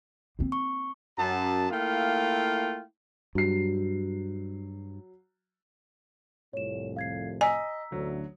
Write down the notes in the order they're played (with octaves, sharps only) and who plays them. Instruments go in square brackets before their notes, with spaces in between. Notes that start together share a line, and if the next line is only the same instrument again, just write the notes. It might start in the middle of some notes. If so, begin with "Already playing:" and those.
[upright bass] A#3 C4
[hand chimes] C#6
[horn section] F#2 A5
A3 A#3 E4 F4 F5 G5
[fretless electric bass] G2 [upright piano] F#3 C7
[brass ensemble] C2 F2 A2 [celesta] C#5 E7
[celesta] F5 G#6 C7
[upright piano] D#5 [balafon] G#5 [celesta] A#5 E6 B6
[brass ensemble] A1 D2 [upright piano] F#3